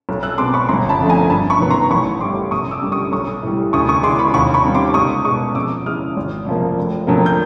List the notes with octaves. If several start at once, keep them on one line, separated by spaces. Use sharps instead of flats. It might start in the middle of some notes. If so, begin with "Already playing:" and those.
B1
E6 F#6
B2 G#3 C4 C6 D6
B5 C#6
G1 A#5 C6
A5 B5
F2 D3 F3 A3
G#5 A#5
G2 A5 B5
B5 C#6
D#3 F#3 B3
A#5 C6
A1 B5 C#6
A2 E3 G3 C6 D6
F#2 C#6 D#6
D6 E6
D3 G3
C#6 D#6
B1 C#6 D#6
A2 E3 G3
D2 C#6 D#6
C#6 D#6
C#3 E3 G#3 C6 D6
B5 C#6
D#2 B5 C#6
B5 C#6
D#3 G3 C4
C6 D6
C#2 C#6 D#6
B2 G#3 C#6 D#6
F2 D6 E6
C#3 E3 G#3 D#6 F6
G#1
F#2 C#3 F3 A#3
F1
F2 D3 F#3 A#3
G6